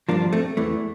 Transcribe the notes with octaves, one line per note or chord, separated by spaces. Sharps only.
G2 F3 A#3 D4
A3 C4
E2 E3 A3